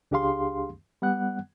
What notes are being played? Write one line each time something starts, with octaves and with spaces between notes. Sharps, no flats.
C#2 D4 G4 G#4 F5 C6
G3 B3 F#5 F#6